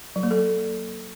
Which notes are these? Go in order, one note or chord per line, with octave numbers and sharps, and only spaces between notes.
F#3
A#3
A4